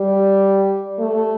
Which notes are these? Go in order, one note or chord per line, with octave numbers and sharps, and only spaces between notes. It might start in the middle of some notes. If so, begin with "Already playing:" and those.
Already playing: G3
A3